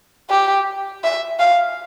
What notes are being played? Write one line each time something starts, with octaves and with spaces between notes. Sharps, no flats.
G4
E5
F5